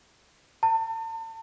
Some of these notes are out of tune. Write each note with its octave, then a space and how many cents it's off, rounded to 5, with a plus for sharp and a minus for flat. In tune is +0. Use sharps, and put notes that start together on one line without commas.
A5 +40